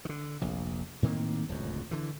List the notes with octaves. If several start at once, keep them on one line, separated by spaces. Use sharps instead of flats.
D3 D#3
F1 A#1
A2 D#3 A#3 C4
D1 C#2 F#2
D3 E3